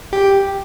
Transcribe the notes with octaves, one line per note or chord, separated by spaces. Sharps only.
G4